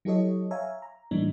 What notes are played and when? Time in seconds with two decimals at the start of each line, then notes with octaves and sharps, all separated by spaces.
0.05 F#3 E4 G4 A4 C#5 D#5
0.51 C#5 E5 F5 G#5 A#5
0.82 A#5
1.11 A2 E3 G3 A#3 D4 D#4